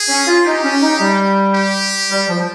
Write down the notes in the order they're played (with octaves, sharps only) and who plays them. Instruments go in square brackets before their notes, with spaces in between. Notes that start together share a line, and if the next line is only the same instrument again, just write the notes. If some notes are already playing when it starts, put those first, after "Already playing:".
Already playing: [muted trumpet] G#4
[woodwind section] C#4
F4
[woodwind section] D#4 [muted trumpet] G4
[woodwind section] C#4
D#4
G3
[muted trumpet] G4
[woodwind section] G3
F3
F3